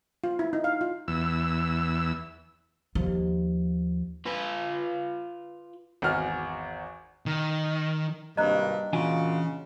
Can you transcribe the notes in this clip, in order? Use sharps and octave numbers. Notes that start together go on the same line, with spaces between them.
F4
E4
D#4
F5
F4
E2 E6
D#2 F3
F4 B4
G#1 E2 F#4 F6
D#3
G#1 G2 C3 A#3 D#5 A#5 F#6
A#2 C#3 E3 D4 F4 F#4 G#5